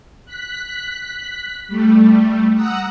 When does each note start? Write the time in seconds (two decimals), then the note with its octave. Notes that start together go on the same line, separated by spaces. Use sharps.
0.25 F#6 B6
1.68 G3 A3
2.54 F#5 A#5 D#6 E6 F#6